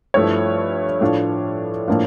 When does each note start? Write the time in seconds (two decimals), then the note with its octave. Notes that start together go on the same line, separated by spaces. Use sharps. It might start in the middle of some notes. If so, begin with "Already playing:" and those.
0.14 G2 F3 A3 E4 C#5
1.01 A2 F3 A3 D4 F4
1.88 A2 F3 A#3 D4 F4